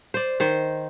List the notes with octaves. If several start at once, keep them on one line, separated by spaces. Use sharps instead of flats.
C5 D5
D#3 C5